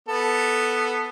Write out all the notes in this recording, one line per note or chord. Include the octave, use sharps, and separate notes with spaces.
B3 A4